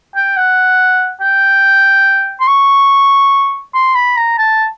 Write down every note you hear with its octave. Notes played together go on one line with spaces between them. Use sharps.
G5
F#5
G5
C6
C#6
C6
B5
A#5
A5